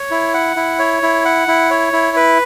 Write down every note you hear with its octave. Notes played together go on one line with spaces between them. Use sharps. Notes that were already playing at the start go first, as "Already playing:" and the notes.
Already playing: C#5
E4
F#5
E4
C#5
E4
F#5
E4
C#5
E4
B4